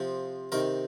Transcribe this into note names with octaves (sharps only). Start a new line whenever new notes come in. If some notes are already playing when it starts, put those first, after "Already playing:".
Already playing: C3 F3
C3 D#3 A#4